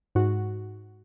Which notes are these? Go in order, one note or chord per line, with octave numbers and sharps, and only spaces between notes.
G#2 F#4